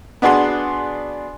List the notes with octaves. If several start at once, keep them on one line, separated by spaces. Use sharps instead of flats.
B3 D4 F#4 G#4 C6